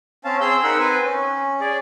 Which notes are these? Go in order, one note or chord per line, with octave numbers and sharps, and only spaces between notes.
C4 C#4 F5 A5
C4 G#4 C5 C6 E6 G6
D#4 A#4 F#5 B5 E6 F#6
C4 B4 C5 G#5
C#4
G#4 D5